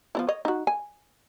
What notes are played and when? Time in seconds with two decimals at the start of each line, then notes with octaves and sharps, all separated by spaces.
0.15 F3 B3 E4
0.28 C#5 D#5
0.45 D#4 F#4
0.67 G#5